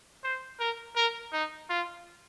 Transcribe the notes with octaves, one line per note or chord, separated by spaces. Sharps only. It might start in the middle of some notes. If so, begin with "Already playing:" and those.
C5
A#4
A#4
D#4
F4